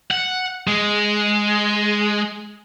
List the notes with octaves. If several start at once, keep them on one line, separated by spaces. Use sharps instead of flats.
F#5
G#3